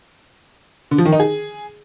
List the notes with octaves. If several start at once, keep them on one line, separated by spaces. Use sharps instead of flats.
D3
F3
D#3
D#4
G#4